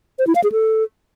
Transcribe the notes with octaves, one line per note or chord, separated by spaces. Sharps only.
C5
E4
F5
G#4
A4